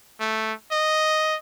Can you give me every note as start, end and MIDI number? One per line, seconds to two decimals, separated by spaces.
0.20 0.53 57
0.72 1.36 75